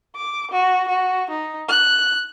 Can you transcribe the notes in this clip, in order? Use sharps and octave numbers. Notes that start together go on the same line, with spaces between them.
D6
F#4
F#4
D#4
F#6